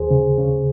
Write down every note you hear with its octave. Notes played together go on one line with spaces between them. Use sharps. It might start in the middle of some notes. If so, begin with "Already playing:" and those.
Already playing: D#2 G#4 C5
C#3
C#3